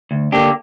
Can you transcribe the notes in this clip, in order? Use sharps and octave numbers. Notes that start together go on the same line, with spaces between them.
D2
D3 A#3 D4 G4